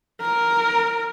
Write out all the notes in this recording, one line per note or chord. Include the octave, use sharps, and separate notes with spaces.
A#4